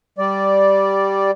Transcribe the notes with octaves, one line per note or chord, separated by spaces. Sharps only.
G3 D5